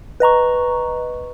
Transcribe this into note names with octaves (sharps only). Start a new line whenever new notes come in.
B4 D#5 A#5 C#6